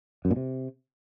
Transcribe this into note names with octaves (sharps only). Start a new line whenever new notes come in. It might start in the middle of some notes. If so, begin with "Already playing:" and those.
F#2
A#2
C3